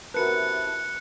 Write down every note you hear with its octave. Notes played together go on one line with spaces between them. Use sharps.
C3 E4 F#4 A#4 B4 A5 F#6 C#7